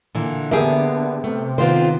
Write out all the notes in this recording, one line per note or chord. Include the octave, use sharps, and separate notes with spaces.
A#2 D3 E3
D3 A#3 B3 G4 G#4 E5
C3 A3
D#3 B3 C4 F4 C5